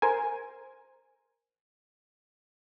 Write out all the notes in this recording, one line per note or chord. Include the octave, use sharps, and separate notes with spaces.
A#4 C5 G#5